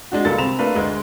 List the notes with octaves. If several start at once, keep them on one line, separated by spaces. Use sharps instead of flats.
G#3 D4 F#4
C#2 G3 A#3 A4 A6
C3 C4 B5 E7 F7
A3 A#3 D4 B4
D2 G#3